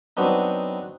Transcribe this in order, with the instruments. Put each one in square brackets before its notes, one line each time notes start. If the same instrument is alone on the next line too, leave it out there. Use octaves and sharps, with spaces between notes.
[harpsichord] F#3 B3 C4 D4 D#4